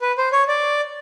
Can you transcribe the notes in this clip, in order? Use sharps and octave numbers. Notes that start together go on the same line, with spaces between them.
B4
C5
C#5
D5